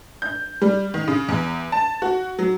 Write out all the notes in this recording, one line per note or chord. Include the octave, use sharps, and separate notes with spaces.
G6
G3
D#3
C#3
E2
A5
F#4
F#3